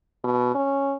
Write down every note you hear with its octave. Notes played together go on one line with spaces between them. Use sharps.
B2
C#4